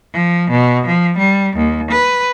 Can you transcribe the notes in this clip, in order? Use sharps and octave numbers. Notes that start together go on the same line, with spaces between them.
F3
B2
F3
G3
D#2
B4